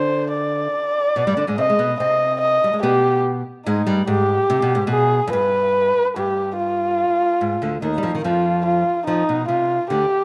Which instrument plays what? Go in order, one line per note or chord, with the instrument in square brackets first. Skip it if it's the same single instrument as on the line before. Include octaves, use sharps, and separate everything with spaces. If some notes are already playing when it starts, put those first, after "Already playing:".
Already playing: [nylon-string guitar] D3 D4 [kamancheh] C5
[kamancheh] D5
[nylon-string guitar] B2 B3
G2 G3
D3 D4
G#2 G#3
[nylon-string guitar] C3 C4 [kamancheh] D#5
[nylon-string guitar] G#3
B2 B3
[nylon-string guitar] C3 C4 [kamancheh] D#5
[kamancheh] D#5
[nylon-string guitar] G3
G#3
[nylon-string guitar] B2 B3 [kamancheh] G4
[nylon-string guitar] G#2 G#3 [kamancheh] D#4
[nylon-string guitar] G2 G3
[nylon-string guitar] G#2 [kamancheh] G4
[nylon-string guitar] C3
B2
G#2
[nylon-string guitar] B2 [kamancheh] G#4
[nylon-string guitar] F2
[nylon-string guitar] G2 [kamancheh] B4
[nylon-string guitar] G2 [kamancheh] G4
[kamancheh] F4
[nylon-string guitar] G#2
D2 D3
[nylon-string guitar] D#2 D#3 [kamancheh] D#4
[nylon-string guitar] G3
F2 F3
D#3
[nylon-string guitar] F2 F3 [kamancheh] F4
[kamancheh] F4
[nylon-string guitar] F2 F3 [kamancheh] D#4
[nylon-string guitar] B2
[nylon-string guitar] C3 [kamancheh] F4
[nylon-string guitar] D2 D3 [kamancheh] G4